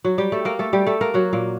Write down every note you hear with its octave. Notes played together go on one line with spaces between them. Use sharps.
F#3 F#4
G3 G4
A3 A4
A#3 A#4
A3 A4
G3 G4
A3 A4
A#3 A#4
F#3 F#4
A#2 A#3